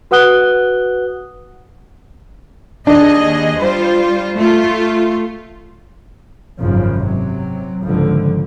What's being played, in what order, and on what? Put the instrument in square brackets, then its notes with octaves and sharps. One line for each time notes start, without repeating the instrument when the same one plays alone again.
[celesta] F#4 B4 F#5 D#6 F#6 G7
[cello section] D#2 G#4 D#5 [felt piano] D4
[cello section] G3 F4 C5
A3 F4
[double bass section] G#1 F#2 C#3 F3
C3 F#3
G#1 C#2 D3 F3